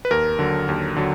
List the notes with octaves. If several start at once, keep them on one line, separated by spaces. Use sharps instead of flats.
B4
D#2 A#4
D3 F#3
D#2
D3 F#3